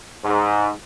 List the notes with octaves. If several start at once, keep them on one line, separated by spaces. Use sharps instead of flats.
G#2